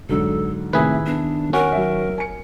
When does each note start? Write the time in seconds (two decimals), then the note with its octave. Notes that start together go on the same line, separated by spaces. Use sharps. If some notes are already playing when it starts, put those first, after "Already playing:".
0.10 F1 G#2 D3 F#3 A4
0.73 A2 C3 D#3 E4 G#4 B4 E5
1.06 B3 D4
1.53 C#4 F#4 A#4
1.72 F#3 E5
2.18 G#5 C#7